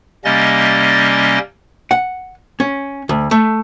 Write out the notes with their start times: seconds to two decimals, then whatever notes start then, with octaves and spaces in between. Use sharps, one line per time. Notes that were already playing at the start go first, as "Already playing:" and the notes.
0.25 C3 G3 A#3 C#4 D#5 A6
1.91 F#5
2.60 C#4
3.09 D2
3.31 A3